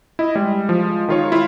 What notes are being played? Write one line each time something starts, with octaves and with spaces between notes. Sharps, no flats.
E4 D#5
G3 G#3
F3
D#3 F4 C#5
E4 F4